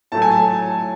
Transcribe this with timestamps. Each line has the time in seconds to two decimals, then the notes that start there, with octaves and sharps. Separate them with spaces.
0.12 A2 F#3 A3 A5
0.22 G#5
0.31 A5